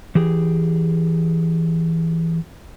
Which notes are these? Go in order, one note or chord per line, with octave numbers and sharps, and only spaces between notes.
E3 G4 G#4